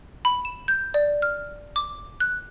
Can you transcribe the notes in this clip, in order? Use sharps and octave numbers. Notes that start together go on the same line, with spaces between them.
B5
E7
G6
D5
F6
D6
F#6